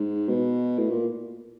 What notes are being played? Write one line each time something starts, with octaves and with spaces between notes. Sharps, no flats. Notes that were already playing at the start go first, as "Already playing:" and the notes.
Already playing: G#2
B2
A2
A#2